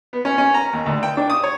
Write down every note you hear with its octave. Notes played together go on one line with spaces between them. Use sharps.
B3
C#4
C#4
A#5
D#2
D2
G5
D4
D#6
C#5